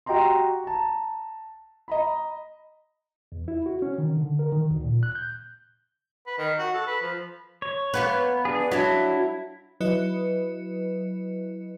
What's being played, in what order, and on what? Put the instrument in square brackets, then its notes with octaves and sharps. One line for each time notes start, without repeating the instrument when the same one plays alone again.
[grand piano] F#4 G4 D#5 G5 A#5 C6
A5 A#5
D#5 A#5 B5
[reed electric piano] E2
E4
F#4
C#4
D#3
D3
A#4
D#3
D2
A#2
F#6
G6
[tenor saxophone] B4
D#3
F#4
A4
B4
F3
[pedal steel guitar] C#5
[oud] A#3 B3 B4
[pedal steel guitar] D4 G#4
[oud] F#3 D4 [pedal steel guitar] E4
[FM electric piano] F#3 E4 B4 D#5 C#7